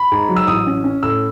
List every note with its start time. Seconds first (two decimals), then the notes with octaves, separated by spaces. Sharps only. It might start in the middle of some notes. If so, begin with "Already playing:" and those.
Already playing: B5
0.12 G#2
0.29 F#3
0.36 E6
0.47 A1 D#6
0.67 C#4
0.84 C#4
1.03 A2 E6